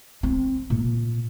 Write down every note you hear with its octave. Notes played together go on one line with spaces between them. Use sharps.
C4
A#2